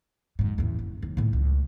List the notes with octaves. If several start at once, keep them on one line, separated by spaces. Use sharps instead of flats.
F2 G#2
A1 E2
F#1
D#2
A2 C#3
C#2